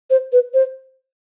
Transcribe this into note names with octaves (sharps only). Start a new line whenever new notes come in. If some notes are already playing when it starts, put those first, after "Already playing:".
C5
B4
C5